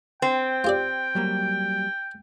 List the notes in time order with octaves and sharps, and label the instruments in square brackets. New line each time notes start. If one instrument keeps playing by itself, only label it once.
[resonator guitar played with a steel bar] C4 [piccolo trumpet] G5
[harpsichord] F4 G4 D5
[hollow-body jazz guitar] F#3 G3 A#3